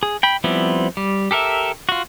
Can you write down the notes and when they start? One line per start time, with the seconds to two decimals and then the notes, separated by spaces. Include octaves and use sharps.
0.03 G#4
0.23 G5 B5
0.44 F3 G3 B3 C4 E4
0.97 G3
1.31 G4 A4 A#4 E5
1.89 F4 F#4